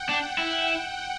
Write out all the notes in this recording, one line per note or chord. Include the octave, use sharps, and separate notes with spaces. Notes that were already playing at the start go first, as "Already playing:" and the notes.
Already playing: F#5 G5
D4
E4